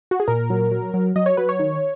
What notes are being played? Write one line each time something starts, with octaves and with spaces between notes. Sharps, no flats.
F#4
G#4
A#2 A#4
F#3
F#3
F#3
F#3 D#5
C#5
F#3 B4
C#5
D#3